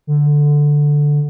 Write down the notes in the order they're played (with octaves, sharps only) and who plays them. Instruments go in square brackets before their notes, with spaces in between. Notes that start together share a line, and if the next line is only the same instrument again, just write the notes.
[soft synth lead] D3